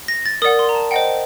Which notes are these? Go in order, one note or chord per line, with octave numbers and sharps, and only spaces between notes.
A#6
A6
A#4 D5 F#5 D#6
C6
A#5
A5
C5 D#5 F#5 G5